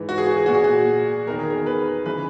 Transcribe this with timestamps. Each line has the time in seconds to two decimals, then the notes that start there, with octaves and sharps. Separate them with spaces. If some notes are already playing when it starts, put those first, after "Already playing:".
Already playing: G#2 E3
0.09 F#4
0.18 G#4
0.27 F#4
0.37 G#4
0.46 A#2 F#4
0.55 G#4
0.64 F#4
1.26 E2 D#3 A#4
1.39 G#4
1.50 A#4
1.66 B4
2.06 C#3 E3 B4